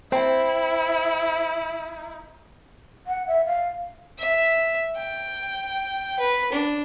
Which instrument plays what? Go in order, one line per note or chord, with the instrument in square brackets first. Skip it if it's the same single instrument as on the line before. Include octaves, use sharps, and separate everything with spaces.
[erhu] E4 [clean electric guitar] C5 G5
[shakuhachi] F#5
E5
F5
[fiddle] E5
G5
B4
D4